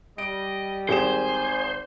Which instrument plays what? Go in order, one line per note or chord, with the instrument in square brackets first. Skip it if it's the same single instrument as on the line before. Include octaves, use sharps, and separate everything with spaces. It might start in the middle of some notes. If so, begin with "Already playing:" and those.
[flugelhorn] G3 [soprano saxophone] D#5 [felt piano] D7
[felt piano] G#1 G#4 E7 [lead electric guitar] C5 [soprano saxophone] G#5